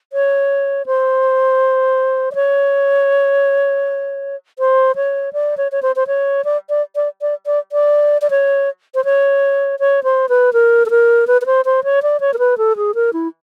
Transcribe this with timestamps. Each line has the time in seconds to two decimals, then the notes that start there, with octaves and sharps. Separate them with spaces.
0.13 C#5
0.86 C5
2.31 D5
2.35 C#5
4.59 C5
4.96 C#5
5.33 D5
5.57 C#5
5.72 C#5
5.82 C5
5.96 C5
6.07 C#5
6.45 D5
6.69 D5
6.96 D5
7.21 D5
7.46 D5
7.72 D5
8.22 D5
8.30 C#5
8.95 C5
9.05 C#5
9.79 C#5
10.04 C5
10.29 B4
10.53 A#4
10.86 A4
10.90 A#4
11.27 B4
11.41 B4
11.46 C5
11.65 C5
11.84 C#5
12.03 D5
12.20 C#5
12.34 A#4
12.39 B4
12.58 A4
12.77 G#4
12.95 A#4
13.13 E4